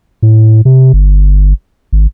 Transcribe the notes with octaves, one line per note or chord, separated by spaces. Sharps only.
A2
C3
G1
G#1